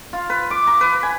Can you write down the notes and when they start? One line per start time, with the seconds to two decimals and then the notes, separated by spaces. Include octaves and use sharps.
0.13 F4
0.30 B4
0.50 D6
0.67 A#5
0.81 B4
1.03 G#5